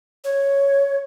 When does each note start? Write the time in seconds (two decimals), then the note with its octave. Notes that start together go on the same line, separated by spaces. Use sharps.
0.24 C#5